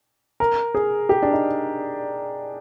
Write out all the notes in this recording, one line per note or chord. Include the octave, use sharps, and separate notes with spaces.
A#4
G#4
G4
D4
D#4